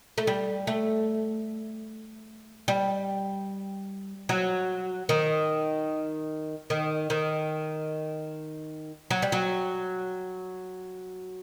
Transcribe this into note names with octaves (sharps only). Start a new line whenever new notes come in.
A3
G3
A3
G3
F#3
D#3
D#3
D#3
F#3
G3
F#3